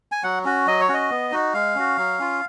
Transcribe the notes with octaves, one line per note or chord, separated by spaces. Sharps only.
G#5
F#3 F#5
C#4 F#4
F#3 D#5
C#5
C#4 F#4
D#5
B3
D#4 F#4
G#3 F5
C#4 F#4
F#3
C#4 F4